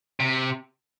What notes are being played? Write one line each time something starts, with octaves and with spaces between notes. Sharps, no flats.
C3